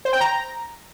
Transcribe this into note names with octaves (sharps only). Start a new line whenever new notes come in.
C5
G5
A#5